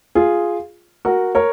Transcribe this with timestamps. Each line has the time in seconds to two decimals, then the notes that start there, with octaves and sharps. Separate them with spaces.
0.15 F4 G#4
1.05 F#4 A#4
1.35 A#4 C#5